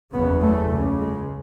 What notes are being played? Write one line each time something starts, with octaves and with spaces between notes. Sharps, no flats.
F#1 E2 C#3 B3
A3
C#2 C#3
G#3